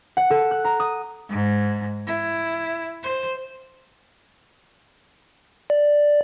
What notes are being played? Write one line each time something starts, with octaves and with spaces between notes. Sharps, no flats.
F#5
A4
F#6
A#5
D#6
G#2
E4
C5
D5